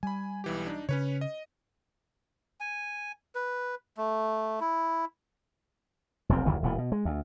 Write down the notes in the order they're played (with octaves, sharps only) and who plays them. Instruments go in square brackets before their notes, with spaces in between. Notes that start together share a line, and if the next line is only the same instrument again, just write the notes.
[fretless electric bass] G3 [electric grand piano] G#5 B5
[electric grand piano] B1 E3 G4
D4 D#4
[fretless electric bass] C#3 [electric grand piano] C#4 B4 C#5
[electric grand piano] D#5
[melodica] G#5
B4
A3
E4
[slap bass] F1 B1 E2 C4
F1 D2 D#3 E3
E1 A#2 E3
B2
G#3
D2